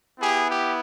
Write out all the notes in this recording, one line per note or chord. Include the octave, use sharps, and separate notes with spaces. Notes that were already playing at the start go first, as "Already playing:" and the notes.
B3 E4 G4 G#4
G4